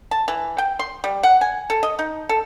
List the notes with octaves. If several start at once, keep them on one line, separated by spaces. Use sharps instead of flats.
A5
E3
G5
C6
G3
F#5
G#5
A4
D#5
D#4
A4